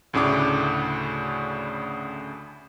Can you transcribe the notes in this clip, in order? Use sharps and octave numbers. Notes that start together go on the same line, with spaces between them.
D2 A2 C#3 D4 D6